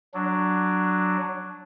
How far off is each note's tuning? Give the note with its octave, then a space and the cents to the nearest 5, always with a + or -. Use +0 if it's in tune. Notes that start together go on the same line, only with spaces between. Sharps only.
F#3 +0 D4 +0